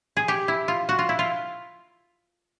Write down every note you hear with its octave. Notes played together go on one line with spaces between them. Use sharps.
G#4
G4
E4
F4
F#4
F4
E4
F4